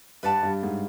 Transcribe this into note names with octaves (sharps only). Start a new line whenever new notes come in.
G2 B4 D5 F#5 A5
G2
G#2